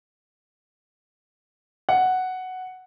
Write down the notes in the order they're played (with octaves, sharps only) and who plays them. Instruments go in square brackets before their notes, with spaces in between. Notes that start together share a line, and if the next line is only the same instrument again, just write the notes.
[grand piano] F#5